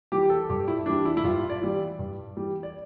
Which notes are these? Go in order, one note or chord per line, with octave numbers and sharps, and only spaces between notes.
E3 G3 G4
A4
G2 G4
E4
E3 G3 D4
E4
E4
G2 F4
D5
E3 G3
G2
E3 G3
D5